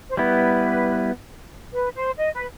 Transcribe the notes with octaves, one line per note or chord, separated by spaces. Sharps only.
C5
G3 B3 E4 B4
B4
C5
D#5
B4